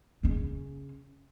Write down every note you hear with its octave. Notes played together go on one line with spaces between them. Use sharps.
C#3 C#4